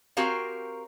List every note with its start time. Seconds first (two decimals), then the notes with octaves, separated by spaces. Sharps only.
0.17 C4 F#4 G4 A#4 C#5 F5